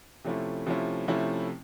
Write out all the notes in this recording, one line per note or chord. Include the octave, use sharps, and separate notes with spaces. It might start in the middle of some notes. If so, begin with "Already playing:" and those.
C3 F3 A3 C#4 E4
C3 F3 A3 C#4 E4
C3 F3 A3 C#4 E4